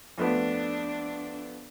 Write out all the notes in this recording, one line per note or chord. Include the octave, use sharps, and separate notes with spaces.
F2 A3 B3 D4